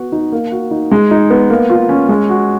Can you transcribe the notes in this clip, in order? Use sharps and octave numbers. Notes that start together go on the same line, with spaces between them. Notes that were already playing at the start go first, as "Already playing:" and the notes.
Already playing: B3 F#4
D#4
A#3
F#4
D#4
G#3
D#4
B3
A#3
F4
C#4
G#3
F#4